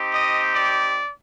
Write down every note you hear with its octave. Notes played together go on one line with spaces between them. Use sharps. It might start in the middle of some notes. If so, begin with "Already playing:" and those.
Already playing: C4 D#4 G4
D#5
D5